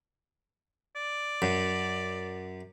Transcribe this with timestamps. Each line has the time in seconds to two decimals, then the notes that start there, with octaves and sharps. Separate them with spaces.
0.96 D5
1.42 F#2